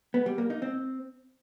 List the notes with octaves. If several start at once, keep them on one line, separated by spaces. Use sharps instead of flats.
B3
G3
A#3
D#4
C4